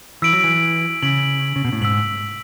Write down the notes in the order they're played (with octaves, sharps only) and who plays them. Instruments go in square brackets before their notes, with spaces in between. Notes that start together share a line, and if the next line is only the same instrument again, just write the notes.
[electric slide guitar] E3 [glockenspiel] E6 B6 D7 F#7
[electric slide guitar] F#3
E3
[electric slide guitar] C#3 [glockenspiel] E6 B6 D7 F#7
[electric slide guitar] C#3
B2
A2
[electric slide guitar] G#2 [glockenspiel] E6 B6 D7 F#7